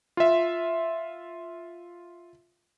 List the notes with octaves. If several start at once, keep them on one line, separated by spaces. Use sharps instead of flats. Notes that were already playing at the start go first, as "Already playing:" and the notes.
F4 E5